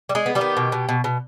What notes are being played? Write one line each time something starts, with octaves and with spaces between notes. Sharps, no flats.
G3
G#3 G#4
B3
G3 G4
D#3
B2
B2
B2
B2